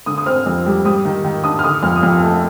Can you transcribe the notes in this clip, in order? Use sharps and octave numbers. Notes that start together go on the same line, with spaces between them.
D3 D#6
D#6
C4 F6
F2
G3
G3 D#6
D#3
D#3
D4 D#6
F6
D3 D#6
F2 F6
D#6
F2 F6
A3